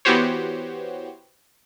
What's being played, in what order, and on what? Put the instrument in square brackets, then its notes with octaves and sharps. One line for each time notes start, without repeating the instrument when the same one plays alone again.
[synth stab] E3 B3 F#4 G4 C5 C#5